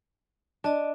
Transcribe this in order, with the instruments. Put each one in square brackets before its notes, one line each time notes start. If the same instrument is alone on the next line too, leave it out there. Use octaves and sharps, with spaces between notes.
[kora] D4 [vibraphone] D5 D#5 A5